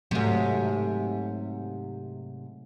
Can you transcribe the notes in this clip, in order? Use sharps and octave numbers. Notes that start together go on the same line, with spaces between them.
G#2 C3 F#3 A3